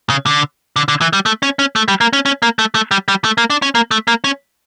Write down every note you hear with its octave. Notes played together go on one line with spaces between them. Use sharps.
C#3
D3
D3
D3
E3
G3
A3
C#4
C#4
A3
G3
A#3
C#4
C#4
A#3
A3
A3
G3
G3
A3
A#3
D4
C#4
A#3
A3
A#3
C#4